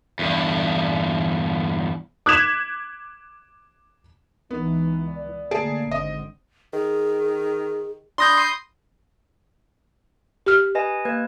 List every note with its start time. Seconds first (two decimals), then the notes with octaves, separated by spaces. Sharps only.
0.19 E2 G2
2.26 D6 F#6 G#6 B6 E7
4.51 C#2 E3 B3 D#4
5.08 D5
5.51 D3 A3 A#3 G#4 A5 D7
5.91 G#1 D3 C4 D#5
6.73 D#3 G#4
8.18 D4 B5 C6 D#6 G6 A#6
10.46 G4 F6
10.75 B4 D#5 G#5
11.05 A#3 B4 G#6